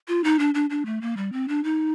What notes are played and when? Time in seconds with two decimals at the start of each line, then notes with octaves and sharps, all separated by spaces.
0.08 F4
0.24 D#4
0.39 D4
0.54 D4
0.70 D4
0.86 A3
1.01 A#3
1.17 G3
1.32 C4
1.48 D4
1.64 D#4